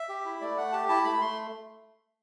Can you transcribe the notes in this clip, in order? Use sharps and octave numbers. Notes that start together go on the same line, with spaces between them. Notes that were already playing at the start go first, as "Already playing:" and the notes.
Already playing: E5
G4
E4
A3 D5
A3 F#5
G4 A5
E4 A5
A3 B5
A3 C6